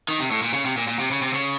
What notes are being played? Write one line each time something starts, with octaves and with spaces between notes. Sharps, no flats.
D#3
C3
A2
A#2
C#3
C3
A#2
A#2
C3
C#3
C3
C#3